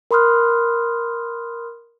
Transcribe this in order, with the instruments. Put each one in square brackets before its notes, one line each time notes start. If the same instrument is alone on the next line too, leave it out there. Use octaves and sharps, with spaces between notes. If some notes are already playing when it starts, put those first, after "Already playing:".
[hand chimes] A#4 B5 C6 D#6 F6 F#6